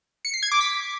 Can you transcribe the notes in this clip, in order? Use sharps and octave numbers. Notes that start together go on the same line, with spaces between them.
C#7
C7
G#6
D6
B6